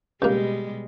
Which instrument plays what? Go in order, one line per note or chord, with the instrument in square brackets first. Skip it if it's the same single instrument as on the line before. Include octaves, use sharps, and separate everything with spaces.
[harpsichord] C#2 A#3 [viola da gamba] B2 G3 G#3 [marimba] G4